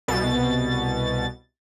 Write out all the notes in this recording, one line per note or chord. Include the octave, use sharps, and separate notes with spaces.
C2 B2 A6